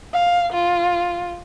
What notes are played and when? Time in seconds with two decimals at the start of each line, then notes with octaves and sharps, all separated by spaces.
0.13 F5
0.53 F4